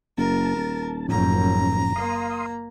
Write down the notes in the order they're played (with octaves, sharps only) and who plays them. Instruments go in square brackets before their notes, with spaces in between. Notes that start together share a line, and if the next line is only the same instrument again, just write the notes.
[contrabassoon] F#1 [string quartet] A#4 [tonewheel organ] A5
[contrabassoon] D#1
[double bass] F#1 F#2 [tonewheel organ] A2 F3 C#4 [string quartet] A#5
[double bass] A#3 [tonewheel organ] F5 C6 D#6